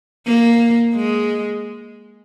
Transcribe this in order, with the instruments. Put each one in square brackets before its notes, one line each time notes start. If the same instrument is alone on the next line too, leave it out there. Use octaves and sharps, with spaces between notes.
[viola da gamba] A#3
G#3